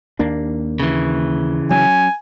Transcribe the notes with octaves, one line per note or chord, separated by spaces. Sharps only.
D#2 A#3 D4
C#3 E3
F#3 C4 C#4 G#5